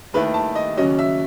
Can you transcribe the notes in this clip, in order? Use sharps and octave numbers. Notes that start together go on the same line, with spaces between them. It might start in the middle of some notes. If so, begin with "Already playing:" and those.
D#2 D#3 A3 E4 B4
A5
D#5
D#2 C#3 F#3 C#4 D#5
E5